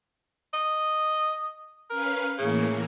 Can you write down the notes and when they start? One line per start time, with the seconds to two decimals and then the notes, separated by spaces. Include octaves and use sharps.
0.53 D#5
1.90 C#4 A#4 B4 F5
2.38 A2 C#3 E3 A#3